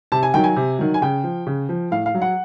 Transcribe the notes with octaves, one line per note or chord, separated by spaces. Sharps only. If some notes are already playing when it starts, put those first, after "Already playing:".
C3 A5
G#5
D#3 F#3 G5
G#5
C3
D#3 F#3
G#5
C#3 G5
F3
C#3
F3
A2 F5
F5
F#3
F#5